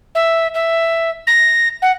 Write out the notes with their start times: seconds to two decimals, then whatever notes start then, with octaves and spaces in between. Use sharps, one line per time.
0.15 E5
0.54 E5
1.27 A#6
1.82 F#5